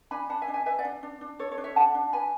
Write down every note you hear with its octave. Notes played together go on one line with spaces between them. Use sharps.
D4 G#5 B5
D4 F#5 A5
E5 G#5
D4
E5 G#5
B4 E5 G#5
D5 F#5
D4
D4
D4
A4 C#5
C#5
D4
C#5 E5
D4 F#5 A5
D4
B4 G#5 B5